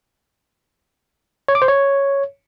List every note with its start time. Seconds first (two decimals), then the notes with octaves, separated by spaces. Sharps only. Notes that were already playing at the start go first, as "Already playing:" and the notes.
1.48 C#5
1.55 D6
1.62 C5
1.68 C#5